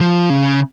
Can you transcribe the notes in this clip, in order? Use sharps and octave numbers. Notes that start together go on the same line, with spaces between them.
F3
C#3